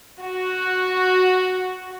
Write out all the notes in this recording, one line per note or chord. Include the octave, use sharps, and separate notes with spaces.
F#4